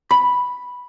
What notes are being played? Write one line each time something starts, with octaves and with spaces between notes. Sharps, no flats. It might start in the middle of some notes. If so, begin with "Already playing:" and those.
B5